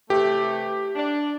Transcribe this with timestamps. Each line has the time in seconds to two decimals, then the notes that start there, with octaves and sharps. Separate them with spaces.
0.10 C3 E3 A3 G4
0.95 D4